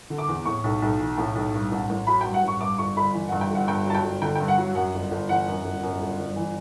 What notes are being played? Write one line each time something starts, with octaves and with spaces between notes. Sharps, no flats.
D3
D6
E2
A2 C#6
B1
B1
E3
A2
B1
G2
A1
A1
F#3 B5
G2 G5
F#5
A1 C#6
G2 D6
G1 C#6
G1 B5
E3
G2 F#5
G5
G1 F#5
G2 G5
F#3 A5
G5
G1
D3 G5
G5
G2
F#5
F#3
F#2 F#5
G1
G1
E3 F#5
F#2
G1
F#2
G1
G1
E3